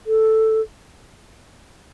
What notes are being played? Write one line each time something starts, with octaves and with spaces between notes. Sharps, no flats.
A4